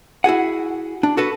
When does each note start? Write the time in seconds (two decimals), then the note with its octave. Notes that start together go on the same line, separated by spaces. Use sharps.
0.24 E4 F#4 G#4 F#5
1.03 D4
1.17 F#4 A4 B4